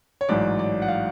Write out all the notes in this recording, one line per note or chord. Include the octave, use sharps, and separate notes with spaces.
C#5
A1 G#2 F#3 D5
D5
F#5
F5